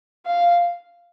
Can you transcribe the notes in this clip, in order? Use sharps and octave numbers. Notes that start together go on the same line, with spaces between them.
F5